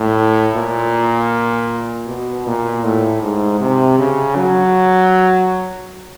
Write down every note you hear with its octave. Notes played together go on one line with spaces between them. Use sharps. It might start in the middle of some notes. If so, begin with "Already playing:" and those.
Already playing: A2
A#2
B2
A#2
A2
G#2
C3
C#3
F#3